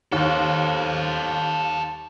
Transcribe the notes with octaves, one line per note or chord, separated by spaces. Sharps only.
D#2 A4 C5